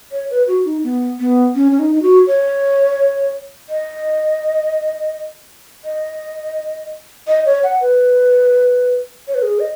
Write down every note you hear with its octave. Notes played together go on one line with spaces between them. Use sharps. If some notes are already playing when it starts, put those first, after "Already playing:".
C#5
B4
F#4
D#4
B3
B3
C#4
C#4
D#4
D#4
F#4
C#5
D#5
D#5
D#5
C#5
F#5
B4
C#5
B4
G#4
D#5